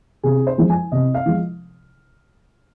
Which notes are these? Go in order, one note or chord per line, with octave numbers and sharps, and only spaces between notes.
C3 G#4
C5
F3 G#3
G#5
C3 D#5
F5
F3 G#3